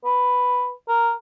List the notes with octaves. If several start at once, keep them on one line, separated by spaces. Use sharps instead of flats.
B4
A#4